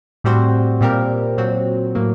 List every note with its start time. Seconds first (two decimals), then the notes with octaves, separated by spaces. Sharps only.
0.24 A2 G3 C4 F#4 C5
0.81 A#2 G3 C4 G4 A#4
1.38 A#2 F#3 C4 F#4
1.95 A2 F#3 A#3